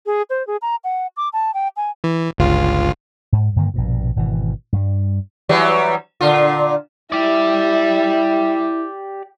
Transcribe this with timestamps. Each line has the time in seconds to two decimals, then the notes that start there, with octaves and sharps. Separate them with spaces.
0.06 G#4
0.30 C5
0.47 G#4
0.62 A#5
0.84 F#5
1.17 D6
1.33 A5
1.54 G5
1.77 G#5
2.04 E3
2.38 G1 C#2 F4
3.32 G#2
3.56 G2 D3 D#3 A#3
3.74 A#1 G2 B2
4.16 G#1 B2 E3
4.73 G2 G3
5.49 E3 F#3 G3
6.21 A#2 D3 F4
7.12 E4 G4 D5 E5